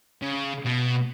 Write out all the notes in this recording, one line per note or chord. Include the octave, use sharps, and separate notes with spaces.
C#3
B2